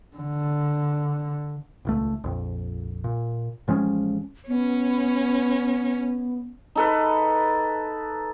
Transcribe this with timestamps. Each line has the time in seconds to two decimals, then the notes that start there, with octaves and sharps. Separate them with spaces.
0.17 D3
1.85 D#1 C#2 A3
2.24 A#1 F2
3.04 A#2
3.68 A1 F3 G#3 C#4
4.48 B3 C#4
6.75 D#4 A4 B4